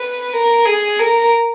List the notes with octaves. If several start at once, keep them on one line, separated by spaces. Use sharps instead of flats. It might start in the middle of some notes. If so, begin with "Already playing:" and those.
Already playing: B4
A#4
G#4
A#4